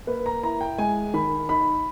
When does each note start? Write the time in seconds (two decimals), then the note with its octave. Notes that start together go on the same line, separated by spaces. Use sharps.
0.07 A#3 B4
0.26 A#5
0.43 E4 A#5
0.61 G5
0.78 G#3 G#5
1.14 D#3 B5
1.49 D#4 B5